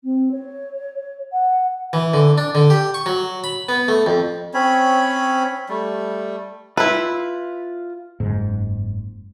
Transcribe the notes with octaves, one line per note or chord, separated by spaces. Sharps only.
C4
C#5
F#5
E3
D3
D4
D3
G4
C#6
F#3
B5
B3
A3
F2
C4 C#4 C#5 B5
G3 A3
E4 F4 B4 C6
F#1 G#2